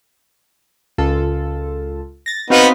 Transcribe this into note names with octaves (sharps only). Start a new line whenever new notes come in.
C#2 F4 A4
A6 A#6
B3 C4 D#4 F#4 B4 F5